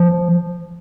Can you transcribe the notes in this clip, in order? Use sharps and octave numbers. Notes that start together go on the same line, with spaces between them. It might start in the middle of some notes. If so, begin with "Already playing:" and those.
Already playing: F3